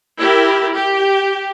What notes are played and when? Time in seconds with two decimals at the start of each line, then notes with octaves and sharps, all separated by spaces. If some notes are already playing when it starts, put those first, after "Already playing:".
0.18 E4 G4 A#4
0.73 G4